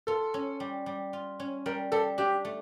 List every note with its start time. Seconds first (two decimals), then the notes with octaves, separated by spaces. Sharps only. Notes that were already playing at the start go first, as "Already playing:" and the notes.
0.07 F4 A4
0.34 C#4
0.60 G3
0.86 G3
1.13 F4
1.40 C#4
1.66 G3 A#4
1.92 G3 A4
2.18 D4 G4
2.45 A3